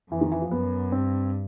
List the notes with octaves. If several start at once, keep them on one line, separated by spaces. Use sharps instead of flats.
F2 E3
D#3
E3
F3
F#2 B3
G2 C4